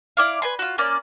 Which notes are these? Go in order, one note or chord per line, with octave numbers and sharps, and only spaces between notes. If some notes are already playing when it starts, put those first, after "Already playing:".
E4 D5 F5
B4 G#5 C6
F4 F#4
A#3 C#4 D5